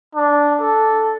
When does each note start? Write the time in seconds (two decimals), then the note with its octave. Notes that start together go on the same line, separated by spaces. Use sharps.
0.15 D4
0.60 A4